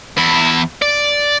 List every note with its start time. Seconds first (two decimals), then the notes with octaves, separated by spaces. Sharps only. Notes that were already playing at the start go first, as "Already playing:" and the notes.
0.18 E2 E4
0.82 D5